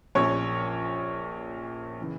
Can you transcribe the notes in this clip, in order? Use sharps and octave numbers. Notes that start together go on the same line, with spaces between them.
A#1 A#2 C#4 C#5
C#3 E3